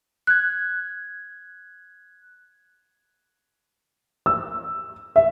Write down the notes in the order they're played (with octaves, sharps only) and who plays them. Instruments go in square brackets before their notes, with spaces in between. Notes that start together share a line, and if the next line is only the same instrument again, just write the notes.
[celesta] F#6 G#6
[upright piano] E6
E5